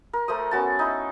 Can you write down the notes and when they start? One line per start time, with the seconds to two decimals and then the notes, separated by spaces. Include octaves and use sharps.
0.13 A#4
0.28 A3 A#4 C5 D#6
0.51 B3 C#4 F#4 A5
0.79 D#4 E4